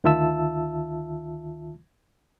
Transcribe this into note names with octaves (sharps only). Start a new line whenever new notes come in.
D2 D#3 F4 E5 A5 E6